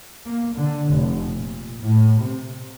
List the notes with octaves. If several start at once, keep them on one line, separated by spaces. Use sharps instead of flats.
A#3
D3
F1
A#2
A2
C3